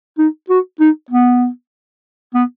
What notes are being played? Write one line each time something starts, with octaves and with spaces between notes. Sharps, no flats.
D#4
F#4
D#4
B3
B3